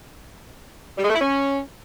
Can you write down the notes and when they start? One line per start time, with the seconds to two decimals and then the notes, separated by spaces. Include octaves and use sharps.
0.98 G3
1.04 G#3
1.09 A3
1.15 E4
1.20 C#4